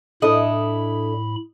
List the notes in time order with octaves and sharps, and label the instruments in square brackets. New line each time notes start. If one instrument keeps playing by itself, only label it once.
[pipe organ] A2 B5 [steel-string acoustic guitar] D4 E4 A4 [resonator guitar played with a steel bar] D#5